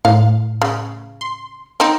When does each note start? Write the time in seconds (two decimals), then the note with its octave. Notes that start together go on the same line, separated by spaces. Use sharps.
0.05 A2 F5
0.62 C#3
1.21 C6
1.80 C4 D#4